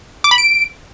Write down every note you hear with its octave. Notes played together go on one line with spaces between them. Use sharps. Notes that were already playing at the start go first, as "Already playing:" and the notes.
D6
B5
D7